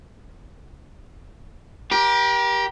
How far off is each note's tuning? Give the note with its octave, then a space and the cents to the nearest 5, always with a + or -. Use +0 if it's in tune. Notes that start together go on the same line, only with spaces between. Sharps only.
G4 +0 A#4 +40